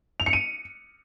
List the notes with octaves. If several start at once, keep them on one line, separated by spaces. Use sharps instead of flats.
F7
C#7
D#7